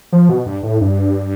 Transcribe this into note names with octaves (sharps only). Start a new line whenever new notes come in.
F3
B2
G2
A2
G2